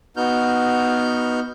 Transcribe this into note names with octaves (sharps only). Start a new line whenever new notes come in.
B3 D#4 F#4 F6 G6